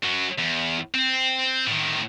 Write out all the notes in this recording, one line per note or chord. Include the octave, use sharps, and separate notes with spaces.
F#2 F#3
E2
C4
A2 D#3